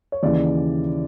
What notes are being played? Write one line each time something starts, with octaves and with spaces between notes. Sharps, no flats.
C#5
D#2 C#3 E3 D5